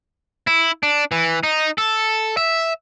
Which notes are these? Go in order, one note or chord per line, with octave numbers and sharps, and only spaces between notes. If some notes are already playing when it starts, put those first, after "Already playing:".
E4
D4
E3
D#4
A4
E5